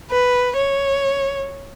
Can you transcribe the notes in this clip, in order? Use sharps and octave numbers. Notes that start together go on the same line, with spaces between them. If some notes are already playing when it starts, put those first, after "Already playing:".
B4
C#5